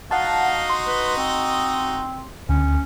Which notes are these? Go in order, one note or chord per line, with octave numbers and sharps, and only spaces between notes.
D#4 F#4 D#5 F5 F#5 A5
C6
B4
C4
D2 C#4